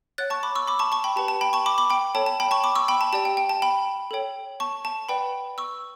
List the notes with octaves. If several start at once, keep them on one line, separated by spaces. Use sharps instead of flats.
C#5 F#5 F#6 A6
A5 C#6
B5 D6
C#6 E6
B5 D6
A5 C#6
A5 C#6
G5 B5
G4 B4 F#5 A5
A5
G5 B5
A5 C#6
B5 D6
B5 D6
G5 B5
A4 C#5 G5 A5
A5
G5 B5
A5 C#6
B5 D6
C#6 E6
G5 B5
A5
G4 D5 G5 A5
G5
G5
A5
G5 B5
A4 C#5 G5
A5 C#6
A5
B4 D5 F#5 G5 B5
C#6 E6